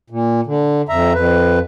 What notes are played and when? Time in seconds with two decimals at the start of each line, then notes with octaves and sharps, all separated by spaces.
0.10 A#2
0.46 D3
0.89 F2 E5 A#5
1.15 F2 B4